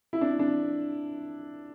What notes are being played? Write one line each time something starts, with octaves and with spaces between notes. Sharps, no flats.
E4
D4
D4